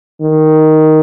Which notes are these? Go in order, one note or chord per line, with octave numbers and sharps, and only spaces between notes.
D#3